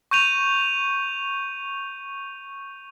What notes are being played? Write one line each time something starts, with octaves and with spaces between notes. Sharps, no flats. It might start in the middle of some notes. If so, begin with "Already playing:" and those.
C#6 G6 D#7 F7